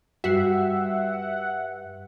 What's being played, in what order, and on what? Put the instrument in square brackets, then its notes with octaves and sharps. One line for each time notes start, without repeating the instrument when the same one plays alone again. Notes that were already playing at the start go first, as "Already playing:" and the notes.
[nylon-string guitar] G2 [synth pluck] F#4 C7 [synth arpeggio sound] E5 F#5